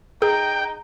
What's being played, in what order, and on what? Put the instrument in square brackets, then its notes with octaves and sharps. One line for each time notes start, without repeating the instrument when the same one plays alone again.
[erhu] D#4 [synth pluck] G#4 [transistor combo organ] G5